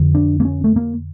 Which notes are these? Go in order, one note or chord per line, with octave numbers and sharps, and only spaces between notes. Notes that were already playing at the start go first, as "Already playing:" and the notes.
Already playing: F2 D3
D4
A#3
C#4
A3
A#3